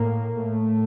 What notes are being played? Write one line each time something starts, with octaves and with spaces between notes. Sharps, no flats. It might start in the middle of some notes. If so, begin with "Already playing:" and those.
Already playing: A2 A#3
A2 A3